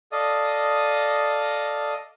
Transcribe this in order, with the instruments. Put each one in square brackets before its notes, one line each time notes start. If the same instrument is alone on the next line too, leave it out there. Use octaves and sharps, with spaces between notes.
[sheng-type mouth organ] A4 D5 D#5 F5 D#6